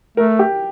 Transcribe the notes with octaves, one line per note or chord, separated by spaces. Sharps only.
A3 A#4
G4